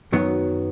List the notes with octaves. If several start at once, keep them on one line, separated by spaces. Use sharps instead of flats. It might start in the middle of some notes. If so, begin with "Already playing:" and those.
F#2 D#3 F#3 B3